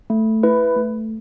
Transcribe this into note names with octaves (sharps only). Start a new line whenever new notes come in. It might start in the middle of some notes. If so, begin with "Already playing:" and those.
A3
E4 B4
A3